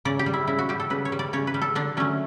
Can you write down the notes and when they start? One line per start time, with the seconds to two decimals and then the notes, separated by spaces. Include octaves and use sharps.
0.05 C#3 D5
0.19 G4
0.26 G3
0.34 E4
0.47 C#3 E4
0.58 F#4
0.69 G3 G4
0.80 A4
0.90 C#3 B4
1.05 C#5
1.12 G3
1.19 D5
1.33 C#3 C#5
1.47 B4
1.54 G3
1.61 A4
1.75 D3 D4
1.97 F#3 A3 C#4